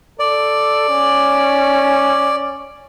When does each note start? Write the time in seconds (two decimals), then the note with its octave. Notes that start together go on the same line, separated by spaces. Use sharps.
0.19 A4 D5
0.89 C#4